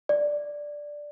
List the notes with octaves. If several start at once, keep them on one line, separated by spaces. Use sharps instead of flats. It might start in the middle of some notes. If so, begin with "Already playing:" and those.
D5